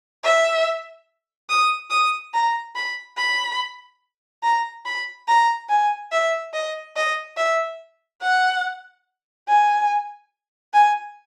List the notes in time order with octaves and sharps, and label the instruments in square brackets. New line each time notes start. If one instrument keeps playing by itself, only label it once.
[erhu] E5
D#6
D#6
A#5
B5
B5
A#5
B5
A#5
G#5
E5
D#5
D#5
E5
F#5
G#5
G#5